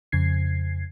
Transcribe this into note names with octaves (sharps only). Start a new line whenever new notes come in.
F2 C#3 G#6 C7